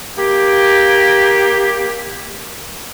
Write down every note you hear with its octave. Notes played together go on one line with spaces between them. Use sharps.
A#3 G4